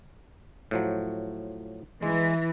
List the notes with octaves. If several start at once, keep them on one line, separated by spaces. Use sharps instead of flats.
A2 F3 F#3
E3 G#3